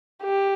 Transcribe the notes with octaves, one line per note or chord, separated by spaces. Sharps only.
G4